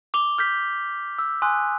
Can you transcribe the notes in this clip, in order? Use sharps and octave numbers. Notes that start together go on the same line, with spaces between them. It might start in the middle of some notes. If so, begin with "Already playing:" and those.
D6 F7 G7
F6 G6 B6
E6
G#5 C6 D#6 F#6